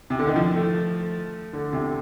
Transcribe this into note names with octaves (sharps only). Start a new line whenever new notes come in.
C3
D3
D#3
F3
A3
D3
C3